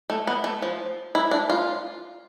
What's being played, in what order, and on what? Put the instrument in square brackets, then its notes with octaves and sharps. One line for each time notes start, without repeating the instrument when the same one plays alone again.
[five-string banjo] A3
B3
A3
F3
E4
D4
F4